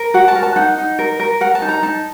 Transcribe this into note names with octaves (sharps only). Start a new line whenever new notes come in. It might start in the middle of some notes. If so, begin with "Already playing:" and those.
Already playing: A#4
F#4 F#5
A5
A#4
A5
D#4 F#5
D#4
A#4
A#4
A#4 F#5
A5
D#4
A#5
D#4 A5